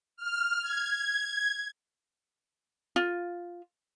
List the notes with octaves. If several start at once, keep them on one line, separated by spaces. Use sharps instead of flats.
F6
G#6
F4